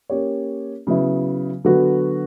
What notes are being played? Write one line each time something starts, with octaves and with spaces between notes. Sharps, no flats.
A#3 C#4 G4 C#5
C#3 F#3 B3 E4
D3 F#3 B3 F#4